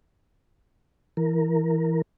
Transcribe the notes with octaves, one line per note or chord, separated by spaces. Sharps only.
E3 A#4